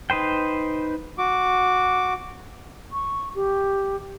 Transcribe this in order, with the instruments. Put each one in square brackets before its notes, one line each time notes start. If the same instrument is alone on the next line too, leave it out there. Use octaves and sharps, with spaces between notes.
[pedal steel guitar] D#4 B4 C5 G5
[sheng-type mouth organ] F#4 D6
[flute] C#6
G4